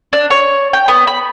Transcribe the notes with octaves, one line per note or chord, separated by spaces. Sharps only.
D4
C#5
G5
B3
B5